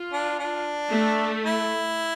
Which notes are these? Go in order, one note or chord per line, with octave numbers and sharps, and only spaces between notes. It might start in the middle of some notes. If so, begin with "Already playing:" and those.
Already playing: F4
D4
D4
A3
E4